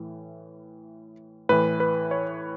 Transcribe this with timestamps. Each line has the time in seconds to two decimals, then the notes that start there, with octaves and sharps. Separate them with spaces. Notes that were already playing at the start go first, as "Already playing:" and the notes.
Already playing: A2 E3
1.49 A2 E3 B4
1.80 B4
2.11 C#5